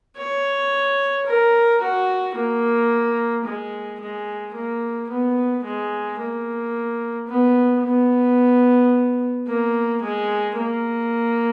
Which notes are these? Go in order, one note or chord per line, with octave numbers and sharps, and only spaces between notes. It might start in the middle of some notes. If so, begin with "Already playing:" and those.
C#5
A#4
F#4
A#3
G#3
G#3
A#3
B3
G#3
A#3
B3
B3
A#3
G#3
A#3